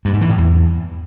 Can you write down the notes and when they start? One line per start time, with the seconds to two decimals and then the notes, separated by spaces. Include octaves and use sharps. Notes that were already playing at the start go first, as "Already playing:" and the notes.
0.05 G2
0.13 G#2
0.21 E3
0.30 A2
0.38 E2